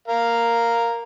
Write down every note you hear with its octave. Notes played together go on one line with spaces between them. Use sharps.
A#4 F5